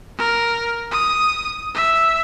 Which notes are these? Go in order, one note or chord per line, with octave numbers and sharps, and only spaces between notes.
A#4
D#6
E5